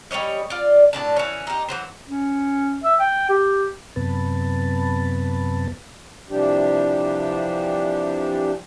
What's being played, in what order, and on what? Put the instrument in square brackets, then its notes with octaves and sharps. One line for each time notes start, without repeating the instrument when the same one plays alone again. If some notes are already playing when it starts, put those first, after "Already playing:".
[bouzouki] G3 C#4 C#5 D#5
F4 D5
A2 G#3 D4 A5
E3 C#4
D#4 G4
E3 F#3 C5
[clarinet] C#4
E5
G5
G4
[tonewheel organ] F#2 C3 B3 B4 A5
[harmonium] C3 E3 F3 G3 D4 G4